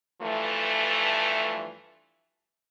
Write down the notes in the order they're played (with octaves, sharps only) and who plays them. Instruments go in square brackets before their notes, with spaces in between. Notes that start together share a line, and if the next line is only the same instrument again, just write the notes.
[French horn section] G2 E3 F3 A3